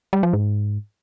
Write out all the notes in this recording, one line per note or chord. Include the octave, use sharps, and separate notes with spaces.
G3
F3
G#2